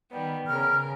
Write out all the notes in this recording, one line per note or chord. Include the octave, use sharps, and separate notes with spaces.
D#3 G3 B3
C#3 A#4 F6